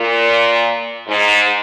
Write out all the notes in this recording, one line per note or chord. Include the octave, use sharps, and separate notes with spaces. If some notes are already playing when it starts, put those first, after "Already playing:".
Already playing: A#2
G#2